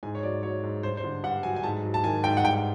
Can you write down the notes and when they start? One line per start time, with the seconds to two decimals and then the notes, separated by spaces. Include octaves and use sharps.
0.03 G#2 G#5
0.15 C#5
0.23 F#3 D5
0.43 F#3 C#5
0.63 G#2
0.83 G2 C5
0.97 C5
1.04 D3
1.23 G2 F#5
1.43 F#3 G#5
1.56 G#5
1.63 G#2 A5
1.83 F#3
1.94 A5
2.04 D#3 G#5
2.24 G#2 G5
2.37 F#5
2.44 G2 G5